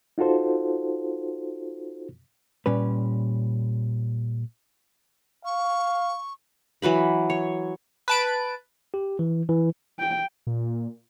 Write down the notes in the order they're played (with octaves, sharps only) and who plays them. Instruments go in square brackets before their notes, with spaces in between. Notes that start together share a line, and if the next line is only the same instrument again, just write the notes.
[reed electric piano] D#4 F4 F#4 A4 C5
[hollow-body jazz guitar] A#2 G3 C#4 B4
[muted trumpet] F5 [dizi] C#6
[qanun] E3 F#3 B4 B5
C#5
[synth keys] B4 A5 D7
[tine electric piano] G4
E3
E3
[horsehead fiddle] G5
[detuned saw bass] A#2